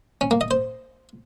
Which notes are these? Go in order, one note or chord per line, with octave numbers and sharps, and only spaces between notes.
C#4
A#3
D#5
C5